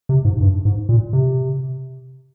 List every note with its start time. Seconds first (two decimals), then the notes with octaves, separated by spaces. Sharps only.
0.09 C3
0.25 G#2
0.41 G2
0.65 G#2
0.89 A#2
1.13 C3